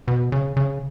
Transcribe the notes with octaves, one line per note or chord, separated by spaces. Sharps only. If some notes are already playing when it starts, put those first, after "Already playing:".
B2
C#3
C#3